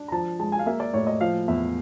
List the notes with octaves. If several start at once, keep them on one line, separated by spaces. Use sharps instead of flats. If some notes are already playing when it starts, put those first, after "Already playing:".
Already playing: D4
A#5
F3 A5
G#3 A5
G#5
F5
A#3 E5
D5
A2 C#5
D#5
F3 F5
E2 E5